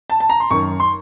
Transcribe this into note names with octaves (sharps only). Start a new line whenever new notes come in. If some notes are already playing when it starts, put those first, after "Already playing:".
A5
A5
A#5
C6
F#2 D#3 C#6
C6